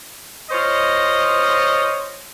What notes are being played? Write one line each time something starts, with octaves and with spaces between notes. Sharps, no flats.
F4 C5 C#5 D#5